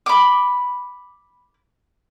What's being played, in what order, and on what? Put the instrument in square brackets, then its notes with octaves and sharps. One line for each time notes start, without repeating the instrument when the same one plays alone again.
[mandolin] B5 D6